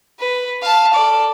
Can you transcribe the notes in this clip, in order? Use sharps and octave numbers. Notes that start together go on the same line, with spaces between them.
B4
F5 A5
A4 D5